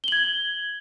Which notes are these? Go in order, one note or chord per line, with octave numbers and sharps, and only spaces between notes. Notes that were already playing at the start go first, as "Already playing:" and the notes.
G#6 F#7 G7